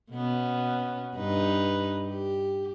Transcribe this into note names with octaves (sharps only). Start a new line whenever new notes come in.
B2 B3 C#4
G2 D#4 B4
G4